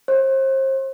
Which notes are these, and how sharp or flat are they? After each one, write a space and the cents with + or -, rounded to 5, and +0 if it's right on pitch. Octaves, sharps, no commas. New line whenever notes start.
C5 +35